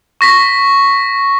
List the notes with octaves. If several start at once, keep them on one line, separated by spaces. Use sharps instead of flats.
C#6 A#6 B6